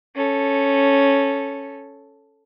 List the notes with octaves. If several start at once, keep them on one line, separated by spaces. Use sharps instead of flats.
C#4 A4